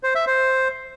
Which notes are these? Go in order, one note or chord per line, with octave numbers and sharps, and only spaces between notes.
C5
E5
C5